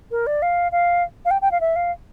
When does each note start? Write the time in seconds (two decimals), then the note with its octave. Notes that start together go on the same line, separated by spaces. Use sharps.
0.11 A#4
0.27 D5
0.42 F5
0.72 F5
1.25 F5
1.31 G5
1.42 G5
1.51 F5
1.60 E5
1.76 F5